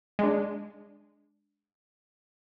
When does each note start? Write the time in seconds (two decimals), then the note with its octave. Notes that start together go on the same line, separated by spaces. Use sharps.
0.19 G#3 D4